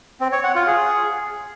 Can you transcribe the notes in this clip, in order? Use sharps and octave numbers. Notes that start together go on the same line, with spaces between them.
C4
C#5
F#5
F4
G#4